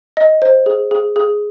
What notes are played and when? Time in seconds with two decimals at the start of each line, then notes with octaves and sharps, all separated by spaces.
0.17 D#5
0.42 C5
0.66 G#4
0.91 G#4
1.16 G#4